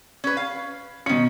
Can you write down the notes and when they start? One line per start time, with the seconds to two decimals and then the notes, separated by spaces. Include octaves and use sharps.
0.24 C#4 B4
0.37 F5
1.06 B2 D#3 C#4 C#7